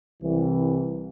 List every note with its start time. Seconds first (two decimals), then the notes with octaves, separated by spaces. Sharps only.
0.22 C2 E3